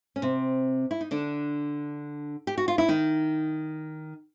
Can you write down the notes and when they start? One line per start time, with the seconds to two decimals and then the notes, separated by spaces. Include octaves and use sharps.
0.16 C#4
0.22 C3 C4
0.91 E4
1.01 D#4
1.11 D3 D4
2.47 G4
2.58 F#4
2.68 F4
2.78 E4
2.88 D#3 D#4